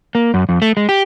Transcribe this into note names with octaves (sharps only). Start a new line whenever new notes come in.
A#3
F#2
F2
A3
G#3
G4